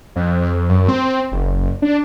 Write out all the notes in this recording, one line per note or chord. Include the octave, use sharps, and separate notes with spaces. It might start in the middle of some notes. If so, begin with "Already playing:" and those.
F2
F#2
C4
F#1
D4